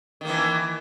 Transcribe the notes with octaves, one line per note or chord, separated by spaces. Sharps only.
D#3 E3 A#3